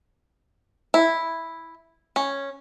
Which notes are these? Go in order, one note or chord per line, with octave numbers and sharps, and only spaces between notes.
E4
C#4